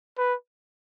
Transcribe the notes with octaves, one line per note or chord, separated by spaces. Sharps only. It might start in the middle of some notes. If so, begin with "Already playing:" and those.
B4